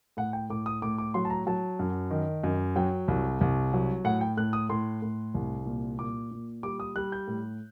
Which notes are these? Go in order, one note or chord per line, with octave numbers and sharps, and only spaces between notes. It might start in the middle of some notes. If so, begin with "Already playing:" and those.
A2 F#5
G5
A2 D6
D#6
A2 D6
D6
F#3 C6
A5
A#5
F#3 A5
F#2
D#3
F#2
F#3 G5
C2
C2
F#3
A2 F#5
G5
A2 F#6
D#6
A2 C6
A2
C2
A#2
A#2 D6
A#2
G3 D6
D#6
G3 F#6
G6
A2